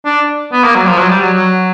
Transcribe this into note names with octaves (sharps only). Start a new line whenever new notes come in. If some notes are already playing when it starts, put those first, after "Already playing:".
D4
B3
A#3
F#3
F3
F#3
G3
F#3
F#3